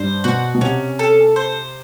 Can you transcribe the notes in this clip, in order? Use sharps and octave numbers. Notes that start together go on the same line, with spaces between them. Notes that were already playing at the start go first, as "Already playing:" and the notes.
Already playing: G2 C5
B2 F#4
B2
C3 C#4
A4
C5